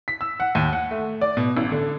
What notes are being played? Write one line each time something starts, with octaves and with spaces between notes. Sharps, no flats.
B6
E6
F#5
D#2
F#5
A3
D5
B2
A1
D3